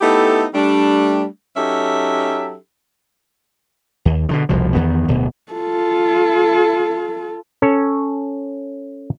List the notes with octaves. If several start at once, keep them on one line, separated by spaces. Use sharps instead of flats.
A3 B3 D#4 E4 G4 A4
G3 A3 D4
F#3 C#4 D#4 G4 A4 E5
D#2
B2 D3 D#3
F1 C2 B2 F3
E2 D#3 B3
D1 B2
F4 A4
C#4 A4 C#5